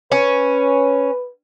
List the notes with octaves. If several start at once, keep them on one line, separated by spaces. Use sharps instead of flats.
C#4 B4